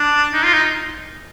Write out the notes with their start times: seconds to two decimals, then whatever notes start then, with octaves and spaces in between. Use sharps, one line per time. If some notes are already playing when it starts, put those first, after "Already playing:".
Already playing: D4
0.34 D#4
0.44 F4
0.53 D#4